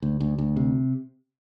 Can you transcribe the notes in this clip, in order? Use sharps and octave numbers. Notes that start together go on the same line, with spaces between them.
D2
D2
D2
C3